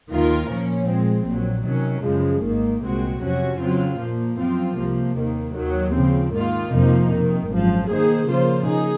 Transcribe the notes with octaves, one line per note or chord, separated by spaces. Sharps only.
D#2 D#3 A#3 F4 A#4
A#2 F3 A#3 C#4
A#2 G#3 C4
A#1 A#2 F#3
C3 D#3 F#3 C#4
F#2 C#3 F3 G#3
G#1 G#2 D#3 A#3
C2 A#2 G#3 C4 F#4
F2 C3 F#3 C#4 F#4
C#3 F#3 C4 F4
A#2 F3 A#3
F#2 F3 C4 F4
C2 C3 F3 A#3
D#2 D#3 A#3
D#2 D#3 F#3
C#3 F3 C4
G#2 D#3 A#3 F4
F2 C3 F3 A#3 D#4
F2 C3 D#3
G#1 F#2 F3
D#3 A#3 D#4 G#4 C5
C#3 F3 A#3 F4 C5
D#4 G#4